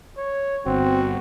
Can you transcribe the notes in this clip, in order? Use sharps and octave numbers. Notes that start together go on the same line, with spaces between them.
C#5
G1 C4 F#4